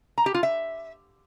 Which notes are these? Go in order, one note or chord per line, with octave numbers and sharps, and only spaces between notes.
A#5
G4
F4
E5